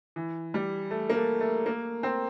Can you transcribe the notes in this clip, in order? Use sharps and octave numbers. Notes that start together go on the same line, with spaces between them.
E3
G3
A3
A#3
A3
A3
A#3
C4